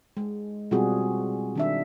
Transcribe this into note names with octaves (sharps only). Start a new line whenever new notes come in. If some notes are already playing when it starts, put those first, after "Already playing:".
G#3
B2 G3 C4 F4 F#4 G#4
D#3 D4 E5